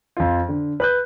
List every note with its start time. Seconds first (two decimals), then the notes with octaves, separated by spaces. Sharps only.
0.17 F2 F4
0.49 D3
0.80 B4 F#6 G6